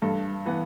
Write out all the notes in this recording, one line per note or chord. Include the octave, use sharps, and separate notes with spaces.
G2 A4
E3 B3